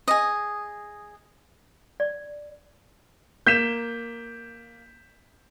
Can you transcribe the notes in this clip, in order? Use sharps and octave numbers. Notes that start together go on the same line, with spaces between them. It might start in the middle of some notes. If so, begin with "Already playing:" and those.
G#4 D#5
D5
A#3 G6 B6 E7